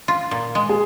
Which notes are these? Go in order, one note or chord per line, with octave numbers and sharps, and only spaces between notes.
F4
A#2
G#3
G#4